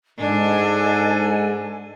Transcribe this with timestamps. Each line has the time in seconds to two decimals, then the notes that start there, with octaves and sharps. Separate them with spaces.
0.19 G#2 D4 A4 D#5 G#5